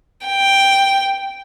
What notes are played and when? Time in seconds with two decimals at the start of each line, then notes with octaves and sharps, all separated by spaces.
0.27 G5